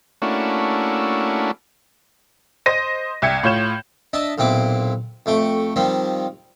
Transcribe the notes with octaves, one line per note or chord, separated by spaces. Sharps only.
A3 A#3 C#4 D4 E4 F#4
C5 D#5 A#6 D#7
C2 E5 G5 G#6 C#7
A2 F4 C#5 G6 E7
D4 D#5 E5 A5
B1 A#2 C4 E4 D6
F2 A3 G5 C#6
D#3 F3 G3 C4